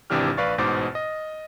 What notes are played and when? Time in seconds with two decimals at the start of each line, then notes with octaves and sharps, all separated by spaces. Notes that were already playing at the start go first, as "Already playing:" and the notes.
0.10 G#1 C3 E3 D4 G4 F6
0.37 A#1 B4 D5 F5 C#6 A6
0.58 A1 G#2 B2 C5 D6 A6
0.95 D#5